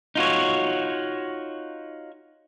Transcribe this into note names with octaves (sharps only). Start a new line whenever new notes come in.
D#4 F4 F#4 C#5